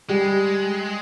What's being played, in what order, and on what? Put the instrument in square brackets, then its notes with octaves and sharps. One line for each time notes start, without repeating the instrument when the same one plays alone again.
[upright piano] G3 [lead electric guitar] G#3